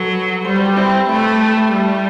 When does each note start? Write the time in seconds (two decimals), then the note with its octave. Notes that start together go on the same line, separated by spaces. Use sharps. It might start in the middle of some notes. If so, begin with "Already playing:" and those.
Already playing: F#3 A4 B4
0.45 G3 C5
0.56 B4
0.66 G4
0.76 C4 E4
1.09 A3 E4
1.71 G3